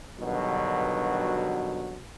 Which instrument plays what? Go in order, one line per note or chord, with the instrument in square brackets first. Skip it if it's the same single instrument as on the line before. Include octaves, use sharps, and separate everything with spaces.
[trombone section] G2 B2 D3 D#3 F#3